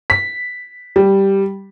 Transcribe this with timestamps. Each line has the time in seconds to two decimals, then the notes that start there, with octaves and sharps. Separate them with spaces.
0.10 B6
0.96 G3